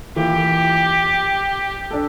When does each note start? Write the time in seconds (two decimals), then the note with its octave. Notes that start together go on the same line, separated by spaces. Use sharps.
0.16 E3 A#3 F4 G4
1.91 D4 A4